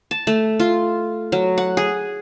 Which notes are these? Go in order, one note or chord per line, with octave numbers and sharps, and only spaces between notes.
A5
A3
F4
F#3
F#5
G#4